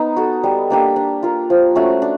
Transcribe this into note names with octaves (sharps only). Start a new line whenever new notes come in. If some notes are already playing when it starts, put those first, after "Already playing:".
Already playing: B3 D#4
F#4 A4
G3
A#3 D4 G4
D4
F4 A#4
F3
A3 C#4 F#4
D4